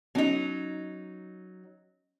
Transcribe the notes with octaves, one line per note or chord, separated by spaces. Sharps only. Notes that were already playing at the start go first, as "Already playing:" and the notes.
F#3 B3 C#4 D#4